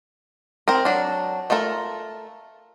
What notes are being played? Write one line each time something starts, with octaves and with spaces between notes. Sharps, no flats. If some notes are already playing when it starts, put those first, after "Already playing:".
C4 A#4
F#3 D4
A3 F4 A4 A#4